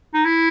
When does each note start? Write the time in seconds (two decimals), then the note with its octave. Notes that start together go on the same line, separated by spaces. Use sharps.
0.14 D#4
0.25 E4